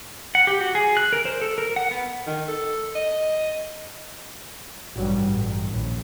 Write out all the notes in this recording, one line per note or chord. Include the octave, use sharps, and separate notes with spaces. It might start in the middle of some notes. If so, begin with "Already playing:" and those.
F#5
G4
F#4
G#4
F#6
A#4
C5
A4
A#4
F#5
B3
D#3
A4
D#5
A1 G2 B2 F#3 G3
A1 G2
A#1 D#2